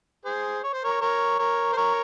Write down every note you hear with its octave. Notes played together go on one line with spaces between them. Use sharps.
G#4 C5
C#5
C5
A#4 C#5
A#4 C#5
A#4 C#5
C5
A#4 C#5